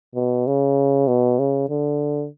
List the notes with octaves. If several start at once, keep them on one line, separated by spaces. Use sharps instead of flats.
B2
C#3
B2
C#3
D3